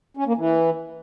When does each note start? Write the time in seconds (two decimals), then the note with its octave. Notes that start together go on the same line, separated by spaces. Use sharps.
0.17 C#4
0.27 A#3
0.37 E3